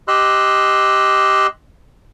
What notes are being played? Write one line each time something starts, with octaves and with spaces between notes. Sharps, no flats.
G4 D#5 C6 E6 F#6